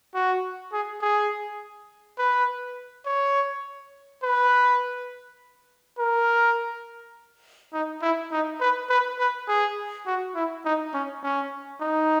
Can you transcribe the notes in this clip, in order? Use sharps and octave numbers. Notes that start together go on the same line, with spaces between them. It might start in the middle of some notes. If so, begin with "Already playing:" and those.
F#4
G#4
G#4
B4
C#5
B4
A#4
D#4
E4
D#4
B4
B4
B4
G#4
F#4
E4
D#4
C#4
C#4
D#4